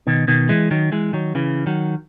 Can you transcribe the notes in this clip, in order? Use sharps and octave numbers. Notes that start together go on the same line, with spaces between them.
B2 D#3
B2 D#3
E3 G#3
D#3 F#3
E3 G#3
D#3 F#3
C#3 E3
D#3 F#3